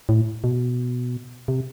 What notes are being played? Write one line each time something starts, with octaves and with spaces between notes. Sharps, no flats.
A2
B2
C3